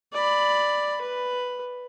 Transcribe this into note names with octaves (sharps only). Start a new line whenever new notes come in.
D5 B5
B4